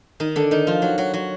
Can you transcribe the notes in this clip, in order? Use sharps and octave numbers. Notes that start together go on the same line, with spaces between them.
D#3 D#4
D3 D4
D#3 D#4
F3 F4
F#3 F#4
F#3 F#4
F#3 F#4